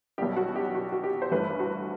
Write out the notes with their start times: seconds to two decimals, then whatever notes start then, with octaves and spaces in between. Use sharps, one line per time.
0.18 B1 B2 G3 G4
0.36 F#4
0.56 G4
0.75 F#4
0.92 F#4
1.03 G4
1.22 C5
1.31 G1 G2 E3 A3 B4
1.60 F#4